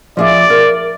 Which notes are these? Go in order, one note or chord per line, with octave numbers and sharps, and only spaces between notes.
F3 G#4 D5 E5
A#4